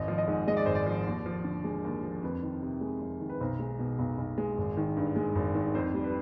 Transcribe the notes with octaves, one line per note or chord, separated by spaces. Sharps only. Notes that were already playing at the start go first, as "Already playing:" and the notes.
Already playing: G#1 D#5
F3
D#5
G#2
G#3 D#5
D5
G#1 C5
D5
F3
D#2
F3
D3
G#3
D#2
F3
F2 B4
D#3
C3
G#3
F2
D#3
B4
B1 C5
G#3
B2
B1
B1
G#3
G#1
D#3
G2
G#3
G#1
D#3
F2 C5
G3
B4